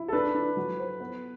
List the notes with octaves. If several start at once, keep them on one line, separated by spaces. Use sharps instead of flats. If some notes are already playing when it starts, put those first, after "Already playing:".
Already playing: E4
A4
D4 B4
D4
F#3
C5
B3